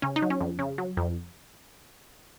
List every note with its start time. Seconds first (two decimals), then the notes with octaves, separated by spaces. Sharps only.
0.02 C#3 C#4
0.16 D#4
0.22 F#3
0.30 C#4
0.41 F2
0.59 C#3
0.78 F#3
0.97 F2